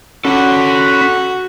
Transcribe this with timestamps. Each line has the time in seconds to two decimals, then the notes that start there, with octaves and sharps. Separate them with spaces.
0.25 C#4 F#4 A4 F#5 B5